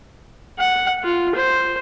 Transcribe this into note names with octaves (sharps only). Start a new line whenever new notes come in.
F#5
F4
C5